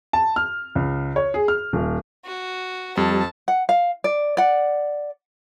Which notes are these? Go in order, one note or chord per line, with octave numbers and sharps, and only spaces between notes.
A5
F6
C#2
C#5
G#4
F6
D#1
F#4
F2 G3 G4 A5
F#5
F5
D5
D5 F#5